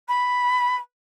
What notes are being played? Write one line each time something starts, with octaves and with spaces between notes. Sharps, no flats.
B5